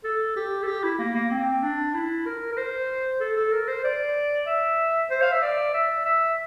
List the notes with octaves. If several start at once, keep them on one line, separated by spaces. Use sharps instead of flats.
A4
G4
A4
G4
E4
A#3
A#3
C4
D4
E4
A#4
A#4
C5
A4
A4
A#4
C5
D5
E5
C5
F5
E5
D5
E5
E5